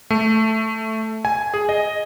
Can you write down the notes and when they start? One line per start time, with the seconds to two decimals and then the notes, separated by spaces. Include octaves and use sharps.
0.10 A3
1.25 G#5
1.54 G#4
1.69 D#5